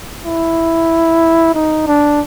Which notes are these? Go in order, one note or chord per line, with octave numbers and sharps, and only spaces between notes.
E4
D#4
D4